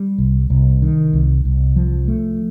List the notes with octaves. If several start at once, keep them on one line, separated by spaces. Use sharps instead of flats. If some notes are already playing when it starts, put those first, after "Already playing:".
Already playing: G3
C2
C2
D#3
C2
C2
F3
A3